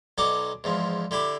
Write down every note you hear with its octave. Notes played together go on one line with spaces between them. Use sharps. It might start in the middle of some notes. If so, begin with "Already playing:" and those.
B1 F#3 D#4 D5 F#5 D6
E2 G#2 F3
D3 E4 G4 B5